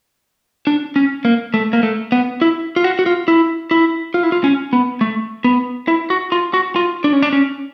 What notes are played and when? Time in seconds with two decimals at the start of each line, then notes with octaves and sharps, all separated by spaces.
0.67 D4
0.96 C#4
1.25 A#3
1.54 A3
1.73 A#3
1.83 A3
2.12 B3
2.41 E4
2.76 F4
2.84 F#4
2.99 F#4
3.06 F4
3.28 E4
3.71 E4
4.14 F4
4.23 E4
4.32 F4
4.44 C#4
4.73 B3
5.01 A3
5.44 B3
5.88 E4
6.10 F#4
6.32 F4
6.54 F#4
6.76 F4
7.04 D4
7.13 C#4
7.23 D4
7.33 C#4